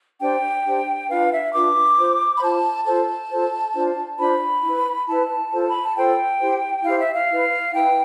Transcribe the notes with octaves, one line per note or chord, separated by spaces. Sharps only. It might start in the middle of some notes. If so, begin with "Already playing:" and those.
D4 G4 C5 G5
D4 G4 C5
D4 F4 B4 F5
E5
D4 F4 B4 D6
F4 C5
B5
F4 C5 A5
F4 A4 C5 A5
F4 A4 C5
D4 F4 C5
D4 F4 C5 B5
E4 B4
E4 B4 A5
F4 A4 C5
B5
A5
F4 A4 C5 G5
E4 G4 C5
E4 G4 C5 F5
E5
F5
E4 B4
E4 B4 G5